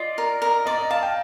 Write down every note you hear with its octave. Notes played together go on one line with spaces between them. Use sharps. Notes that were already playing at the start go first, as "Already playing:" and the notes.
Already playing: F4 D5 D#5
A#4
A#4
D5 D#5
D#5
F5 A5
G5